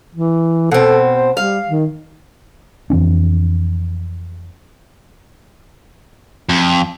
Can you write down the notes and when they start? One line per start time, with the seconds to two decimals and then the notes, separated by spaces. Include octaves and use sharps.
0.15 E3
0.72 B2 C4 A4
1.12 C5
1.37 G3 F5
1.69 D#3
2.90 F2 E3 C4 D4
6.49 F2